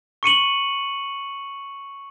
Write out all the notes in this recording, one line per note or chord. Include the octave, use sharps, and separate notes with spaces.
C#6 C#7 D#7 F#7